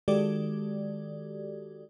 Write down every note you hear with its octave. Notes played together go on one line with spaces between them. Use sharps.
D#3 G#3 F#4 G4 A4 D5